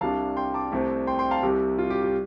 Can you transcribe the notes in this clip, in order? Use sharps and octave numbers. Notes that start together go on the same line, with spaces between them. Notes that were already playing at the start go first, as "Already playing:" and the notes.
C2 C3 G3 D4 F5 A5
G5 C6
A5 D6
C2 C3 A3 C4
G5 C6
G5 C6
F5 A5
C2 C3 G3 G4
F4
G4
G4